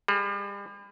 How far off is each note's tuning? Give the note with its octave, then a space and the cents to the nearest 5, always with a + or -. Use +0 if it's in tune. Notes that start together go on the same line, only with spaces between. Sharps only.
G3 +40 G#4 +45